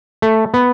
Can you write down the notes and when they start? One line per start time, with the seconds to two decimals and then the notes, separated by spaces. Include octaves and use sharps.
0.22 A3
0.54 B3